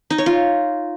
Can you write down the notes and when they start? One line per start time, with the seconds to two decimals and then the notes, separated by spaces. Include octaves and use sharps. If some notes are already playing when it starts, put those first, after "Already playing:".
0.10 D#4
0.18 C#5
0.26 F4